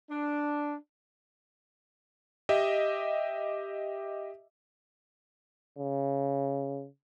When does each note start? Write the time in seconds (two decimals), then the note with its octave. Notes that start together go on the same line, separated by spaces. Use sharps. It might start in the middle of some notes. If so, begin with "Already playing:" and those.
0.10 D4
2.49 G4 D#5 E5
5.78 C#3